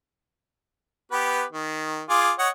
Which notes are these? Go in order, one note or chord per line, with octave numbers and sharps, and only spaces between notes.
B3 G4 B4
D#3
F4 G#4 D6
C#5 D#5 F#5